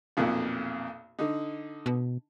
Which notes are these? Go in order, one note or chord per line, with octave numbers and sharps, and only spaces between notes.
B1 F2 A#2
D3 D#4
B2